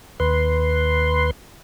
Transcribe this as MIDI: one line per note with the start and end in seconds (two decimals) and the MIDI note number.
0.20 1.31 39
0.20 1.31 71
0.20 1.31 84